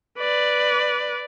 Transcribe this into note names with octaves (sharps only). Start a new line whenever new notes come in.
B4 D5